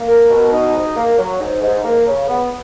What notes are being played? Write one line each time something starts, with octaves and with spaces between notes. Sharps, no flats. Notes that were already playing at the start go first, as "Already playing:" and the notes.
Already playing: A#3
A#4
B2
D#4
G#2
A#3
F#3
G#2
G#2
A#3
C#3
B3